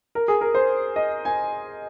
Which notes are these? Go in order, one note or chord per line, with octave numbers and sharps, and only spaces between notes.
A#4
G#4
A#4
C5
D#5
G#5